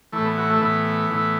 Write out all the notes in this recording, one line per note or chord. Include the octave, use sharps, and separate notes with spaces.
E3 A3
A2
B3
F#4
A3
A2 E3 B3
A2 E3